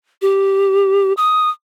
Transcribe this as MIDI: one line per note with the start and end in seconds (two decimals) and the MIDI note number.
0.22 1.13 67
1.17 1.49 87